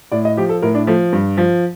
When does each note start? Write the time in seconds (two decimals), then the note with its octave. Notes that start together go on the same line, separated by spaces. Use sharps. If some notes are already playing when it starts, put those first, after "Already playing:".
0.11 A2 D5
0.25 D#5
0.37 F3 G4
0.49 A4
0.62 A2 A#4
0.75 D4
0.87 F3 A3
1.13 G2
1.37 F3